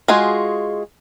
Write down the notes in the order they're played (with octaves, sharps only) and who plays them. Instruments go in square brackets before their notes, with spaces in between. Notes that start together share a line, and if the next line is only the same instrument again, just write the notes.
[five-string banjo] G#3 F4 F#4 G#4